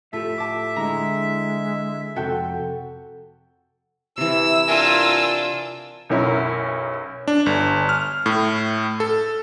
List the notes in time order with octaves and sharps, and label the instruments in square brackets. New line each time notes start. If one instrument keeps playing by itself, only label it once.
[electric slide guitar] A2 F4 G4 [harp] A4 [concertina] E5
[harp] A5 D6
[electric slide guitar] D3 E4 [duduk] G#3 [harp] A#5
[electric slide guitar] F2 C3 [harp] F#4 A4 G5
[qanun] C3 E3 [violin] E6
[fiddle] D4 F4 [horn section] A#4 G#5
[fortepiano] B1 F#2 C#4 E4 A#4
[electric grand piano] D4
G1
F6
A2
A4